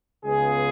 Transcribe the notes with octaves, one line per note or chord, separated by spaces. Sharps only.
C#2 C#3 G#3 B3 G#4